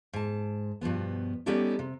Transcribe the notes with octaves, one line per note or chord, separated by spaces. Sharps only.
G#2 A5
G2 B2 F3 B3
G3 B3 C#4 D#4 G4 A4
C3